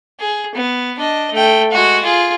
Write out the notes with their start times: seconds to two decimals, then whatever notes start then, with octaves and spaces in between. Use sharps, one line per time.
0.20 G#4
0.55 B3
0.99 D4 D#5
1.32 A3 G5
1.71 G#3 F#4
2.03 F4 G#4